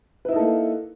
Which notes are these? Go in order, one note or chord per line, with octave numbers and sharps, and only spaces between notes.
A#3 D#4 E4 A4 B4